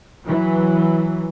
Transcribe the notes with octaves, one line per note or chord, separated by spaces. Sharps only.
E3 F#3